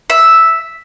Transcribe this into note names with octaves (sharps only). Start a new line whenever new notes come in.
E5